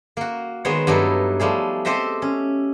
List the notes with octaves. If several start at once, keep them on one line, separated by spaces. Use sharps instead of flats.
A#3 F#4
D#3 G#3 B3 F#4 C5 C#5
G2 F#3 D#4 E4 A4 B4
F3 G3 A3 G#4
C4 G4 A4 C5 D#5 E5
C#4